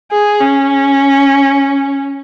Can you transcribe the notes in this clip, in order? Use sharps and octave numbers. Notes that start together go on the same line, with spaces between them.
G#4
C#4